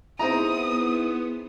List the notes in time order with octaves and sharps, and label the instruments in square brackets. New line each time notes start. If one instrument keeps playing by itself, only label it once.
[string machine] B3 [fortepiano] C4 A#5 [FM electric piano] D#4 E4 G#4 [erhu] D#6